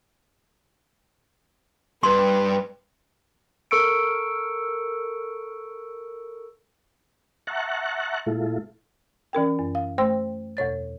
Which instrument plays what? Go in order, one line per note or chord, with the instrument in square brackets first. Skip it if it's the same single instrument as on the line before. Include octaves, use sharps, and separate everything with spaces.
[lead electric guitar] G2 [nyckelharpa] B4 [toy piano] C6
[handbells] A4 A#4 C#6 E6 C#7 D7
[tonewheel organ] E5 F#5 A5 A#5 C#6 F#6
A#2 G#3 E4 F4 A4
[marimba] E3 C#4 A#4 G5
F#2
F5
A3 C5 G5 C6 E6
E2 B2 C#5 A6